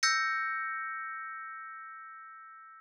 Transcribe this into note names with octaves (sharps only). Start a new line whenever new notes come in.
E6 G6 A#6 C#7